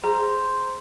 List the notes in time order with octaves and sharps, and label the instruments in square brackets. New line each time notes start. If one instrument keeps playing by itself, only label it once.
[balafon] G#4 [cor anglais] C5 [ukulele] A#5